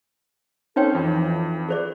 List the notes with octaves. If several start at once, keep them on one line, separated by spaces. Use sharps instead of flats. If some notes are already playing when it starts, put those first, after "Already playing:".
C4 C#4 D#4 A4 C5 C#5 G5
F2 E3
G#4 C5 D5